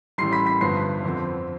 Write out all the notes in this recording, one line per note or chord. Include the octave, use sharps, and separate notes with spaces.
A1 A2 G3 C6 C7
B5 B6
B5 B6
G1 G2 F3 B3 C6 C7
F2 D3 F3 C4